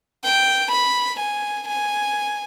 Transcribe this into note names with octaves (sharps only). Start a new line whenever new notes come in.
G5
B5
G#5
G#5